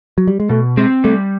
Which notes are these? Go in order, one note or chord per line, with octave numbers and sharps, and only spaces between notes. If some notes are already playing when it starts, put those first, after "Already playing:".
F#3
G3
G#3
B2 A3
G#3 C4
G3 A3